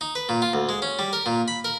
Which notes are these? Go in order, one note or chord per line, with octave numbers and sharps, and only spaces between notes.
D#4
B4
A#2
F4
D2
G#3
C#4
G3
A#4
A#2
B5
A#4